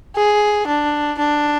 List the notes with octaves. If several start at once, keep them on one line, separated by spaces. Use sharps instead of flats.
G#4
D4
D4